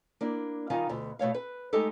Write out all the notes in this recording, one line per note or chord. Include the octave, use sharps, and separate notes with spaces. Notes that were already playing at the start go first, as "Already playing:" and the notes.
A#3 D4 E4
D#3 G3 D#4 F4 F5 G#5
D2 B2
B2 A3 C#5 F5
B4
G#3 A3 D#4 G4 A4